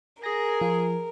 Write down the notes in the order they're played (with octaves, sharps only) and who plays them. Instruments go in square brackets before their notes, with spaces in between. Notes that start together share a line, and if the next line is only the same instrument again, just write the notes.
[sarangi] G#4 [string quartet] A#4 [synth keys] A#6
[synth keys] F3